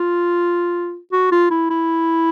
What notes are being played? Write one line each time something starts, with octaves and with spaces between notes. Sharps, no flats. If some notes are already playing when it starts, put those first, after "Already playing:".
Already playing: F4
F#4
F4
E4
E4